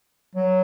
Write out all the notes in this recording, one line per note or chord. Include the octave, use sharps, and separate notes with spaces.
F#3